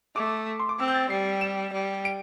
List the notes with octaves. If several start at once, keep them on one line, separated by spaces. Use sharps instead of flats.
A3 D6
C6
D6
C4 E6
G6
A6
G3 C7
E7
G3
D7